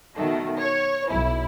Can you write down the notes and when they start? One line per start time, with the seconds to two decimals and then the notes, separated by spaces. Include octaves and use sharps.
0.15 B2 D#3 A3
0.59 C#5
1.10 B1 E4